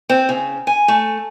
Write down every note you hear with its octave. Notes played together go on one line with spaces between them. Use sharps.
C4
C#3
G#5
A3